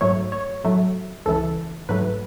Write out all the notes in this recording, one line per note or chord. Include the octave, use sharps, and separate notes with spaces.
G#2 F#3 A3 C#5
C#5
A2 F#3 A3
C#2 C#3 E3 A4
G#2 F#3 A3 B4